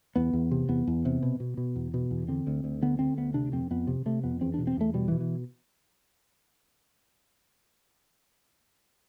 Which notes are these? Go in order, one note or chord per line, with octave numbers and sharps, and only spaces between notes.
E2 B3
E2
C3
E2 B3
E2
C3
B2
B2
B2
E2
B2
E2
D3 C4
D2
D2
D3 B3
D3 C4
D2 B3
C3 D4
F2 C4
F2 B3
C3
C3 A3
F2 B3
E2 C4
B2 D4
C4
E2 A3
B2 G3
E3
B2
E3